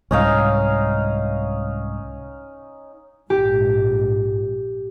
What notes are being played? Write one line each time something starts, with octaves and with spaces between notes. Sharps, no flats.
C2 G#2 C#4 D#4 F5
A#1 G#2 G4